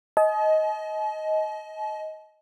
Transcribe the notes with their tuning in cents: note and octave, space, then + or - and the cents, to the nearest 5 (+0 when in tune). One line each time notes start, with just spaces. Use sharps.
D#5 +15 A5 -45